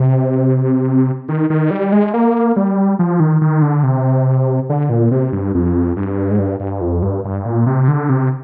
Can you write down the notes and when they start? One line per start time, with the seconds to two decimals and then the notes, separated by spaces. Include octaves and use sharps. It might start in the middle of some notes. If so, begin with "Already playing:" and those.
Already playing: C3
1.29 D#3
1.50 D#3
1.71 G3
1.92 G#3
2.14 A#3
2.56 G3
2.99 F3
3.20 D#3
3.41 D#3
3.62 D3
3.83 C3
4.70 D3
4.90 A#2
5.11 C3
5.33 G2
5.55 F2
5.97 G2
6.31 G#2
6.39 G2
6.60 G2
6.81 F2
7.02 G2
7.25 G2
7.45 A#2
7.66 C3
7.88 D3
8.09 C3